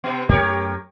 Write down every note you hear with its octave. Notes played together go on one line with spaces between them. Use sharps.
C3 B3
F#2 A3 G4 A#4 C#5